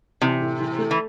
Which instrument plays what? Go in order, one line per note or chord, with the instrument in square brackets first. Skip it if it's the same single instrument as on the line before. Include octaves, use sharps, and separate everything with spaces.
[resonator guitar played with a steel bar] C3 [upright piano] E3
[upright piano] A2
E3
A3
[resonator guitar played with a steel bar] E3